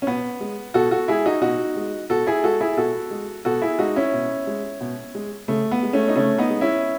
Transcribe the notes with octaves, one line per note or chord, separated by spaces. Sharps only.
C#4
B2 B3
G#3
B2 F#4 A4
F#4 A4
G#3 E4 G#4
D#4 F#4
B2 D#4 F#4
G#3
B2 F#4 A4
E4 G#4
G#3 F#4 A4
E4 G#4
B2 F#4 A4
G#3
B2 F#4 A4
E4 G#4
G#3 D#4 F#4
C#4 E4
B2
G#3
B2
G#3
C#3 A3
B3
G#3
A3 C#4
D#4
C#3 A3 C#4
B3 D#4
G#3
C#4 E4